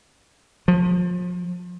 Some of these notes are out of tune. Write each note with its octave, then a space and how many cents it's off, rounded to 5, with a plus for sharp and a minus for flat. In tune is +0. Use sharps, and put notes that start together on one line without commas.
F3 +35